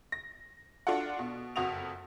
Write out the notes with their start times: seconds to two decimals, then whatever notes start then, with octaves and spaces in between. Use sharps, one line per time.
0.12 A#6
0.87 D4 F4 F#4 A4 F#5
1.19 B2
1.56 F#1 F2 F#4 D#6 F7